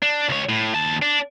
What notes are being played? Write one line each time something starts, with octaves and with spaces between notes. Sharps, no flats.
D4
C#2 C#5
A2
D#2 A5
D4